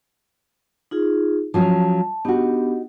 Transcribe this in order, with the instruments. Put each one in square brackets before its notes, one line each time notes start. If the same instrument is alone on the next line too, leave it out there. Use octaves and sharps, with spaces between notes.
[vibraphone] D#4 F4 G#4
[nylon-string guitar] F3 F#3 C#4 [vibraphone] A5
[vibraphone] B3 D4 G4 [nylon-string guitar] D#4 F#4